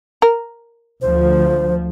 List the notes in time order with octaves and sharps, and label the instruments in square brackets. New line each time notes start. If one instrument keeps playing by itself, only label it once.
[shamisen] A#4
[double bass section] D2 F3 [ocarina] C5